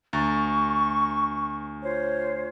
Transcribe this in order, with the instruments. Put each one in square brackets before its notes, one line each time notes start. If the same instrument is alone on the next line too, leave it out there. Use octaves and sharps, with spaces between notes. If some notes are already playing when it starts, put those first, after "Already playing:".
[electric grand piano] D2 A#5 A6 [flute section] C#6
[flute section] F4 C5 C#5